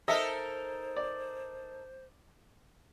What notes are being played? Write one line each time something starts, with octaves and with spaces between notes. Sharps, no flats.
D#4 A4 A#4 C5 D#5 E5
D5